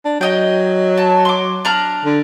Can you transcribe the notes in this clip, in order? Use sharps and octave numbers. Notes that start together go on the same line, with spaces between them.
D4
F#3 D#4 D#5 G5
A5
C6 D6
D4 A#5 F6
D3